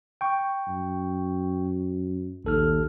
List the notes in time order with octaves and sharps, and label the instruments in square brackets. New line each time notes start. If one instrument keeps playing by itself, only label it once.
[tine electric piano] G5 C#6
[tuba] F#2
[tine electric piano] A#1 A4 F6 [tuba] D#2